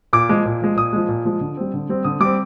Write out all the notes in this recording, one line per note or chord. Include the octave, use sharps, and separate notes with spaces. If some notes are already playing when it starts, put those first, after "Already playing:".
A#2 D6
F3 G#3
A#2
F3 G#3
A#2 D#6
F3 G#3
A#2
F3 G#3
D3
G3 C4
D3
G3 C4
D3 D#6
G3 C4 D6